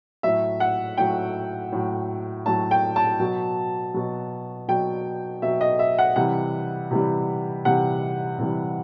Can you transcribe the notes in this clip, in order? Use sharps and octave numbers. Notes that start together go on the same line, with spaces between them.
A2 F#3 E5
F#5
A2 F#3 G5
A2 F#3
A2 F#3 A5
G5
A5
B2 F#3
B2 F#3
B2 F#3 G5
B2 F#3 E5
D#5
E5
F#5
C3 E3 G3 F#5
C3 E3 G3
C3 E3 G3 F#5
C3 E3 G3